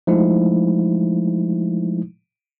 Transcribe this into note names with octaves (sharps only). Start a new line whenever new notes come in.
F3 G#3 A3 D#4 E4